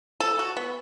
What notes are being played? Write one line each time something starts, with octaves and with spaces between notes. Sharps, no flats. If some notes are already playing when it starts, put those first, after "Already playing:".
A4
F#4
B3